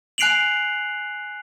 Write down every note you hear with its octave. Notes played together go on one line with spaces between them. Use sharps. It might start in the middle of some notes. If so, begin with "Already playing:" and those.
G#5 F#6 C7 D7 F7 F#7